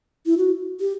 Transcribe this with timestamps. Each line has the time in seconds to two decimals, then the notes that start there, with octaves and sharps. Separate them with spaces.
0.26 E4
0.38 F#4
0.80 G4